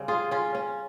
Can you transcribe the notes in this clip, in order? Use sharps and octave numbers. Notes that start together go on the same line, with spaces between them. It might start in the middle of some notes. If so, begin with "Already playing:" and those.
Already playing: C#3 G3 C4
F4 G#4
C#4 F4
C#4